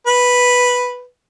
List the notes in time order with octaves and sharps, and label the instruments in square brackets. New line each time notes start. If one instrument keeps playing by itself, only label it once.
[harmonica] B4